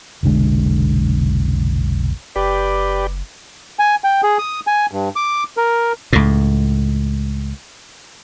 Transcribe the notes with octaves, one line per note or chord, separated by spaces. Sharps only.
F1 B1 D3 G#3
F#1 G4 B4 D5
G#5
G5
G#4
D#6
G#5
G2
D6
A#4
C#2 A2